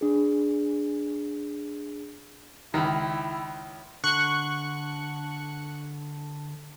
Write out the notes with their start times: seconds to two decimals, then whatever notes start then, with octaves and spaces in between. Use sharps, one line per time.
0.01 D4 G#4
2.74 C#2 D#3 E4
4.04 D3 C#6 F#6 C#7